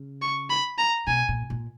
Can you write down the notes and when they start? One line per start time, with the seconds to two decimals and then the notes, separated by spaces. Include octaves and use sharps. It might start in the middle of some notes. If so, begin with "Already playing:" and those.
Already playing: C#3
0.22 C#6
0.50 B5
0.78 A#5
1.07 B2 G#5
1.29 A#2
1.50 A#2